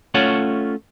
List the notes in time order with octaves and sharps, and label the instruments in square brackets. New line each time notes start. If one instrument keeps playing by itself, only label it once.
[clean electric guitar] A3 C#4 F4 C#5 F#5